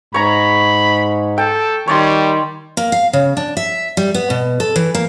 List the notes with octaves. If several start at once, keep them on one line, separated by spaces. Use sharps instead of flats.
G#2 C#5 A#5 B5
A4 G5
D#3 G3 C#5 D5 C6
A#3
F5
C#3
D4
E5
G3
B3
B2
A4
E3
A#3